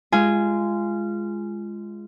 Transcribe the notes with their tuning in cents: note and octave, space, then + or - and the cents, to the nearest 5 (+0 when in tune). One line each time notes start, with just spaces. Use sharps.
G#3 +0 F4 -20 G#5 +0